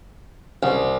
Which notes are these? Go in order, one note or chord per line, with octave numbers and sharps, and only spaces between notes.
C2